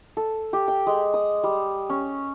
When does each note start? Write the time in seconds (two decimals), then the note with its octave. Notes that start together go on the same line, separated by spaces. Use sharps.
0.17 A4
0.53 G4
0.68 G5
0.87 G#3
1.14 D#6
1.44 G3
1.90 C#4